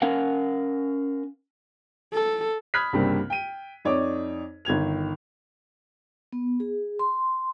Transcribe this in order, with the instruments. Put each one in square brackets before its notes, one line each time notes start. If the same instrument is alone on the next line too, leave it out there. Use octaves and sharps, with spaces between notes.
[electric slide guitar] C#4 A#4 F5 F#5
[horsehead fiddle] A4
[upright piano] B5 D#6 F6 F#6 G#6 B6
C2 G2 C#3 G3 A#3 C4
G5 D#7
F2 D#4 C#5 D5 D6
G1 D#3 G#6 F7
[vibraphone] B3
G#4
C6